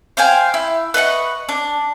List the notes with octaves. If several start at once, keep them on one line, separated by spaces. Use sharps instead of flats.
C5 F5 G5 G#5
E4
B4 D#5 F#5 C#6
D4